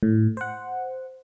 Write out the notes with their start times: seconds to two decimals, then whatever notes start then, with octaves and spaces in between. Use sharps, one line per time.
0.03 A2
0.37 C5 F#5